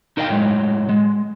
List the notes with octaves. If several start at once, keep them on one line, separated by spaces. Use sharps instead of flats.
D#4 A#4 D#5 F5 G5
A2 F#3 G#3
G#3